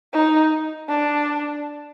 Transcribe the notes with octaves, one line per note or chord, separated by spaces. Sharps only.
D#4
D4